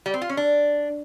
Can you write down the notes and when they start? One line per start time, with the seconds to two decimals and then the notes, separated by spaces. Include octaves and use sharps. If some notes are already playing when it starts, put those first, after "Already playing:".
0.06 G3
0.14 C4
0.22 F4
0.29 C#4
0.37 D4